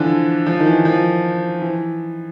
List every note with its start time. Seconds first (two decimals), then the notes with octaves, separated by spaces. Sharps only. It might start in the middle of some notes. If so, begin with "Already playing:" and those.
Already playing: D3 E3 F3
0.46 F3
0.60 D#3
0.66 E3
0.85 F3
1.61 E3